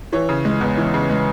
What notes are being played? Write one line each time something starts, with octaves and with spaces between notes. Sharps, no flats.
E3 C#5
C#3
G#3
E2
E3
C#3
G#3